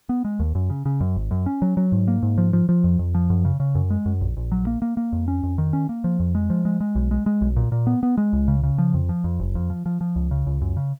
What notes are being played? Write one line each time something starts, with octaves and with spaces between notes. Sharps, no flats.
B3
G#3
D#2
F#2
C#3
C#3
F#2
G#1
F#2
C#4
F#3
F#3
G#2
A#3
G#2
F3
F3
F3
F2
F2
F3
F#2
C#3
C#3
F#2
G#3
F#2
A#1
A#1
F#3
A#3
A#3
A#3
F2
C#4
F2
D#3
C#4
A#3
F3
F2
G#3
F3
G#3
G#3
B1
G#3
G#3
B1
A#2
A#2
B3
B3
G#3
C#2
C#3
C#3
F3
F2
F3
F2
F#1
F2
F3
F3
F3
C#2
C#3
C#2
F#2
C#3